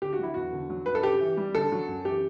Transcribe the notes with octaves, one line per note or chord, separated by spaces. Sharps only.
D3 G4
F#4
F#3 E4
E2 F#4
D3
F#3
G2 B4
A4
C#3 G4
E3
G3
D3 A4
F#3
F#2
E3 G4